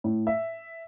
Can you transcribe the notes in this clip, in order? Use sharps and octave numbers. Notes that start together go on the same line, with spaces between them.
A2
E5